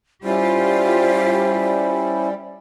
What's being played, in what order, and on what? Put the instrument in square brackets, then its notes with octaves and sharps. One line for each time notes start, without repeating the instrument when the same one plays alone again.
[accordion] G3 [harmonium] C#4 E4 [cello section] F4 G4 [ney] C5